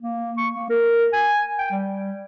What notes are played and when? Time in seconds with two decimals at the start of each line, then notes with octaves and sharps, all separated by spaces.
0.02 A#3
0.38 C#6
0.56 A#3
0.70 A#4
1.13 G#5
1.59 G5
1.71 G3